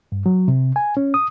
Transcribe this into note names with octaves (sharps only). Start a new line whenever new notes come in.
G2
F#3
C3
G#5
C#4
D#6